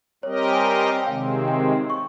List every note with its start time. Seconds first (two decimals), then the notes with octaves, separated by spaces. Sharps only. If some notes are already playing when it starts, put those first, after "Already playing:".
0.23 G3 C4 G4 A#4 C#5 D#5
0.52 G#5
0.78 G5
1.02 G5
1.06 C3 D#3 G#3 C4 F5
1.48 G5
1.90 C#6